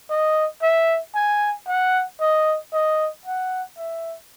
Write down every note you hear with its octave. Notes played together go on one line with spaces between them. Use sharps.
D#5
E5
G#5
F#5
D#5
D#5
F#5
E5